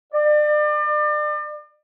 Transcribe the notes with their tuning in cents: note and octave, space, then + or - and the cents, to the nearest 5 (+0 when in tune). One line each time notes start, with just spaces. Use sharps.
D5 +35